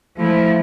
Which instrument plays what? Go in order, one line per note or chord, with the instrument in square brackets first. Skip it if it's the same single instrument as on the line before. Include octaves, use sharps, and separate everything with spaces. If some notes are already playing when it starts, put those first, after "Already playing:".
[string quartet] F3 A3 E4